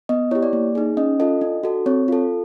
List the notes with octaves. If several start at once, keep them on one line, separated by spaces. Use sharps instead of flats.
B3 D#5
E4 G4 C#5
D5
A#3
D#4 G#4
C#4 D#5
F4 A4 D#5
D4
F#4 A4
C4 C#5
F4 A4